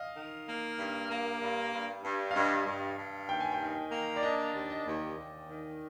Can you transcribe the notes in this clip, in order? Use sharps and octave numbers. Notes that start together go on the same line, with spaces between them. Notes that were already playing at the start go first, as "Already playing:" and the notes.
Already playing: D#5 F5
D#3
A#3
G2
A#3
G2
G2
G2
F5
G2 D#5
G2
G2
D#2 G5
G#5
G5
D#3
A#3
D5
D4 D#5
D#2
D#5
D#2
D#2
D#3